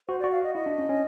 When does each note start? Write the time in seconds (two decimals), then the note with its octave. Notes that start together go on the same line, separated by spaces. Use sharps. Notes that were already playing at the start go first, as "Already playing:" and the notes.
0.08 F#4 C5
0.20 D5
0.24 F#4
0.32 F5
0.43 D#5
0.55 E4 D#5
0.66 D4
0.78 C#4
0.89 C#4